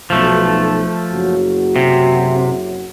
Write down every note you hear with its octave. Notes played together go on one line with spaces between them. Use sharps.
B1 F3 A3
F#1 F#3 F#4
C3